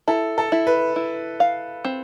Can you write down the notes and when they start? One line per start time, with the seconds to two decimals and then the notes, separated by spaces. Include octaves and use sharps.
0.08 E4 A4
0.38 A4
0.52 E4
0.67 B4
0.96 E4
1.40 F5
1.85 C4